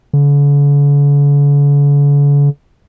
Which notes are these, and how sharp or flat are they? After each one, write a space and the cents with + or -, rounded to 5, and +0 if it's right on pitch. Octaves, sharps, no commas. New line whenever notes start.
D3 -45